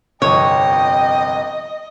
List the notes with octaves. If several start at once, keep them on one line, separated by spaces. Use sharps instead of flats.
G1 C2 F2 C#5 D#5 G5